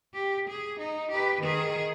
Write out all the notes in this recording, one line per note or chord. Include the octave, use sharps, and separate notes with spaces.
G4
G#4
D#4
G4 B4
D#3 G#4